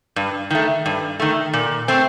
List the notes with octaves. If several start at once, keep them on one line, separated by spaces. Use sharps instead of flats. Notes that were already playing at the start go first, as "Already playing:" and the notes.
G2
D#3 A3
G2
D#3 A3
A#2
A3 C4